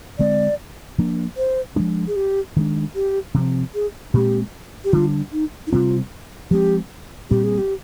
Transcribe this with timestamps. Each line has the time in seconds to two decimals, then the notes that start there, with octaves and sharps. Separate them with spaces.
0.19 D3 G#3 C4 D5
0.98 F3 A#3 D4
1.37 C5
1.76 F3 G#3 D4
2.07 G#4
2.16 G4
2.56 D#3 G#3 D4
2.95 G4
3.34 C3 F3 C4
3.75 G#4
4.14 A#2 G#3 C4 G4
4.84 G4
4.93 D3 G3 D4 F4
5.32 D#4
5.67 D#4
5.72 C3 G3 C4 F4
6.51 F3 G#3 C4 G4
7.30 A#2 G3 C4 G4
7.44 G#4
7.58 G4